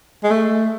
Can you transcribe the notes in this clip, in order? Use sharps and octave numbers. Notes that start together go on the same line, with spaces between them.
G#3
A3